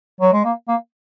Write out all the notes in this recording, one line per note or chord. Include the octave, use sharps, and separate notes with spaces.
F#3
G#3
A#3
A#3